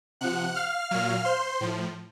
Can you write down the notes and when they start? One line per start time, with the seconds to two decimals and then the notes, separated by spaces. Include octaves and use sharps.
0.21 C3 F3 F#5 F#6
0.55 F5 F6
0.91 A#2 F#3 F5 F6
1.25 C5 C6
1.61 A2 F3